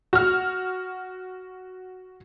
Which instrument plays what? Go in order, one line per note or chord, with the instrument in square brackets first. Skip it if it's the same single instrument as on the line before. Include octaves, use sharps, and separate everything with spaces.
[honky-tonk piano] F#4 F6